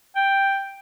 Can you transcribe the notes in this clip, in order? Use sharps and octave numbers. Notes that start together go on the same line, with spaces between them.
G5